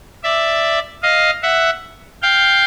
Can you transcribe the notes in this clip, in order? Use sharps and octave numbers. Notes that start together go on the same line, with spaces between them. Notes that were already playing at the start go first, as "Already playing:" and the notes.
D5 E5
D#5 F5
E5 F#5
F5 G5